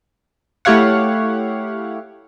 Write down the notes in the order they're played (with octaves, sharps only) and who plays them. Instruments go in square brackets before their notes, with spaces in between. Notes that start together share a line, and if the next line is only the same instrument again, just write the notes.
[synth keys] A3 E4 G4 C#5 F5 F#5